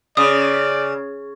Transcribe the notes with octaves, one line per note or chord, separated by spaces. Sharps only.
C#3 D5 D#6